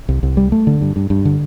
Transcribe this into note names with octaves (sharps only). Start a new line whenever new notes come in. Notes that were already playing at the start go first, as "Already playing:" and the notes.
C2
C2
G3
A3
D3
G2
G2
G2
D3